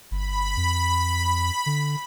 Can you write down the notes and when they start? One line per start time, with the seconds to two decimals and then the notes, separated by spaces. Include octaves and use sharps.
0.11 G1 B5
0.57 F2
1.66 D3